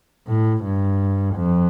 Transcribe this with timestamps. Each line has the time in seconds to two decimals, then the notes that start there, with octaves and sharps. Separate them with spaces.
0.27 A2
0.64 G2
1.35 F2